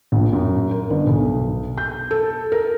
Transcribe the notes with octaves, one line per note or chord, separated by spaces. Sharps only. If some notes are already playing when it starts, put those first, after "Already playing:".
A#1
F#2
A#4
G1
B1
G6
A4
A#4